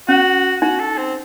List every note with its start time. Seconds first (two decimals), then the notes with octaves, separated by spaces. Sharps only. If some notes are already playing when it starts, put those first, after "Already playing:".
0.09 C#4 F#4
0.62 D#4 F#4
0.80 A4
0.98 C4